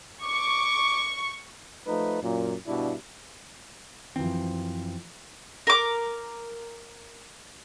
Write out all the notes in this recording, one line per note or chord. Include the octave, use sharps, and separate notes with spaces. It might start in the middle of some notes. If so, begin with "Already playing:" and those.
C#6 D6
F3 A3 D#4 B4
F#2 A#2
G2 B2 D4 E4
F#2 E3 F3 C4
A#4 D6